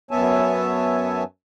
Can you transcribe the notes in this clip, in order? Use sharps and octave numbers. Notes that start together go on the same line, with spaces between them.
F#2 B3 C#5 E5 G#5 A5